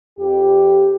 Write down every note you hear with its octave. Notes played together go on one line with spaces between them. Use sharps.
F2 G4